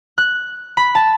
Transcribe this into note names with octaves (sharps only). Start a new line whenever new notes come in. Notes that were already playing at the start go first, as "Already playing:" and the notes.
F#6
B5
A5